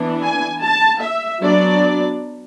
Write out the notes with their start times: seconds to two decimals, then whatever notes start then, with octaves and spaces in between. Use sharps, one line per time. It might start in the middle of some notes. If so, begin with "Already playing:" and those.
Already playing: E3 B3 D4
0.24 G#5
0.63 A5
1.02 E5
1.43 F#3 B3 D4 D5